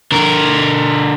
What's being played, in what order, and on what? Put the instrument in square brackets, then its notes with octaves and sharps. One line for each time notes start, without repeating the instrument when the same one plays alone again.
[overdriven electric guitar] D3 A#4